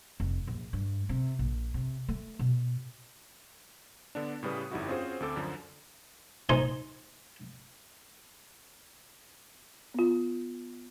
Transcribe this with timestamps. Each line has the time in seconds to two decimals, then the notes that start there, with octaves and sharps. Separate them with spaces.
0.20 F1
0.47 A#1
0.73 G2
1.09 C3
1.39 A#1
1.74 C3
2.08 A3
2.39 B2
4.15 D3 B3 D4
4.43 A2 C#3 G3 B4 D#6
4.71 G1 F2 G3 D#4 E4 F#4
4.88 C4 C#4 F4 F#4 G#4 C5
5.20 D2 C4 A4 D6
5.36 F#2 D3 F3
6.49 D#4 C5 D#5 G#5
9.94 B3 F4